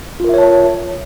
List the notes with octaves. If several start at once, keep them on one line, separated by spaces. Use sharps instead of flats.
F4 A#4 C#5 E5 A5